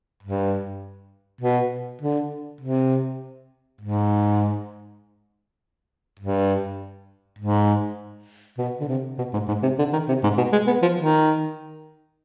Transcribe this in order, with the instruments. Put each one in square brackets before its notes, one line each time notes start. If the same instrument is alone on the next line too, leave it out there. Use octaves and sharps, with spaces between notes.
[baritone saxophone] G2
B2
D3
C3
G#2
G2
G#2
B2
D3
C3
B2
G#2
G#2
C3
D3
D#3
C3
G#2
B2
G#3
B3
F3
D#3